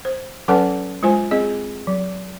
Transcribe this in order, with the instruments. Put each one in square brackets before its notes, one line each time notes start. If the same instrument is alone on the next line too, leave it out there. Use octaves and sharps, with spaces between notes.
[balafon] C5
F#3 C#4 A4 B4 F#5 A5
G#3 F4 C5 G#5
C4 G#4 D#5
F#3